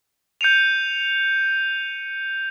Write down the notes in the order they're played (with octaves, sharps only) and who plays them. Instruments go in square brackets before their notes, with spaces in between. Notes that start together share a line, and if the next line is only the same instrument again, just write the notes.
[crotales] G6 C#7 D#7 F7